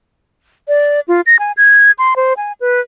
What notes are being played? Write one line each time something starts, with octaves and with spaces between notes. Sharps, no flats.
D5
F4
A#6
G#5
G#6
C6
C5
G#5
B4